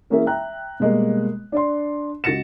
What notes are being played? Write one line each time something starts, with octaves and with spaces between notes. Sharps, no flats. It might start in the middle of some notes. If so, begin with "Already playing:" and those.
E3 A#3 C#4 G#4 A#4 E5
E5 G5 A#5 F#6
B2 G3 G#3 A#3
D4 D5 C6
C#2 F#4 A6 A#6 C#7 E7